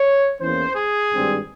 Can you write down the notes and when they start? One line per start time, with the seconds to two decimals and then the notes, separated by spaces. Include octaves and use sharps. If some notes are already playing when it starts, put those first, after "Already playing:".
Already playing: C#5
0.39 E2 E3 A#3 C#4 C5
0.75 G#4
1.12 G#1 G2 G3 C4